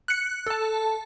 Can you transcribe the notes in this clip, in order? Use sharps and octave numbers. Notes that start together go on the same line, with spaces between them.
F#6 C#7
A4 A5